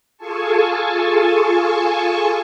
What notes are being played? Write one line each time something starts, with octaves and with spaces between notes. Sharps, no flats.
F4 G#4 A4 G#5 A5 C#6